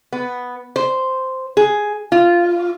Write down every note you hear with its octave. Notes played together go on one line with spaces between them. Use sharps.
B3
C5
G#4
F4